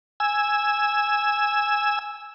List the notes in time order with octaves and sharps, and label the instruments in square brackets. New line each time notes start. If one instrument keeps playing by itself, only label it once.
[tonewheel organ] G#5 E6